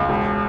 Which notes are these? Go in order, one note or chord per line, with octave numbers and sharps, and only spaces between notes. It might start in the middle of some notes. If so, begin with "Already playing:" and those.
Already playing: C#2
E1